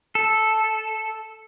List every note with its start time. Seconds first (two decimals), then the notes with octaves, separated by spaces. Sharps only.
0.15 A4